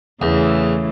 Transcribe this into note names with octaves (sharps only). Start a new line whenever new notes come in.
E2 C#3 E3 A3